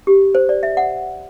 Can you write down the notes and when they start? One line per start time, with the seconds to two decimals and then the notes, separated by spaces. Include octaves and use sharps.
0.07 G4
0.35 C5
0.49 D5
0.63 E5
0.77 F#5